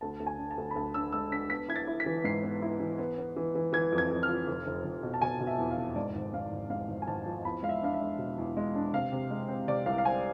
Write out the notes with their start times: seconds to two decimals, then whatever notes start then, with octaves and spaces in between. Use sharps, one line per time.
0.01 D2 A5
0.20 D2
0.27 G#5
0.39 D4
0.51 A5
0.58 D2
0.71 B5
0.76 D2 A5
0.94 D4 E6
1.13 G#3 E6
1.32 D4 B6
1.50 B3 B6
1.68 E4 G#6
1.76 A6
1.87 E4
2.00 B6
2.06 E3
2.24 G#2 C7
2.43 B3
2.62 E4
2.80 E3
2.98 B3
3.18 B3
3.36 E3
3.55 E3
3.73 E3 G#6
3.92 F2
3.98 G#6
4.10 F2
4.23 F6
4.29 F4
4.47 F1
4.67 F1
4.85 F1
5.03 B2
5.14 A5
5.22 B2 G#5
5.41 B2
5.47 E5
5.59 E2
5.71 F5
5.77 F1
5.96 G#2 D5
6.15 G#1
6.33 G#2 F5
6.52 G#1
6.70 G#2 F5
6.88 G#1
7.02 G#5
7.07 G#1 A5
7.26 F3
7.45 E2 B5
7.63 G#3 F5
7.69 E5
7.82 D4 F5
7.94 E5
8.00 G#3
8.18 B2
8.38 E2
8.57 G#3
8.75 D4
8.94 C3 F5
9.12 C3
9.31 G#3
9.48 C4
9.67 C3 D5
9.86 C2 F5
9.98 F5
10.05 C4 G#5